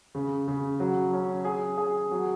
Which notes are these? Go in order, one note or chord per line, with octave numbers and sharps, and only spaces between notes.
C#3
C#3
F#3
C#4
G#4
G#4
F#3